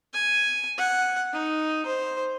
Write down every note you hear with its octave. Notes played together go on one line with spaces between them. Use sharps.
G#5
F#5
D#4
C5